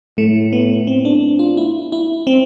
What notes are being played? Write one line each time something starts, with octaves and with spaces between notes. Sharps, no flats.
A2 A3
B3
C4
D4
F4
E4
E4
C4